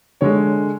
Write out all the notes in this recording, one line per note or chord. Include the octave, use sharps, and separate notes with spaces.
D3 G#3 C#5